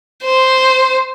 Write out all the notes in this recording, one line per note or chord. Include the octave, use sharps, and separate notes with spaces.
C5